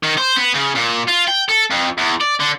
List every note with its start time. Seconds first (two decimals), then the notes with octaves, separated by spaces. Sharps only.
0.03 D#3
0.18 C5
0.36 B3
0.54 C#3
0.75 A#2
1.08 F4
1.28 G5
1.49 A4
1.71 F2
1.98 E2
2.21 D5
2.40 D3